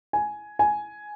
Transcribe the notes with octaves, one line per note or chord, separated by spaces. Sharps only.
G#5
G#5